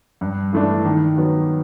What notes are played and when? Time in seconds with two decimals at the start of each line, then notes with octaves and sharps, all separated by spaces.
0.21 G2
0.53 E3 A3 D4
0.85 D#3
1.17 F#3 B3